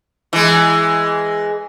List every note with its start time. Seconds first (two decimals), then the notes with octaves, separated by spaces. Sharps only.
0.33 E3 G#3